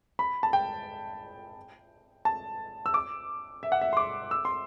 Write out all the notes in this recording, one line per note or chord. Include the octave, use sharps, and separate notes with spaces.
B5
A5
G5
A5
E6
D6
E5
F#5
E5
C6
D6
E6
C6